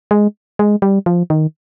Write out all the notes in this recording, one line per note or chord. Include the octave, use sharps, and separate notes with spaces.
G#3
G#3
G3
F3
D#3